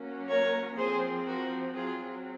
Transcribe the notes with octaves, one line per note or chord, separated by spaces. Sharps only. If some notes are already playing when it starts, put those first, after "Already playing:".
Already playing: F#3 A#3 C#4
A#4 C#5
F3 C4 G#4 C5
F#4 A#4
F#3 C4 F4 G#4